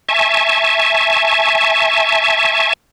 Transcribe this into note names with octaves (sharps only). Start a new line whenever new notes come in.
E5 G#5 A5 C#6